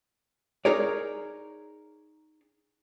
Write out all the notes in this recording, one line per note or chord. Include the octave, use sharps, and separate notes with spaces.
D#4 G#4 A#4 C#5 D5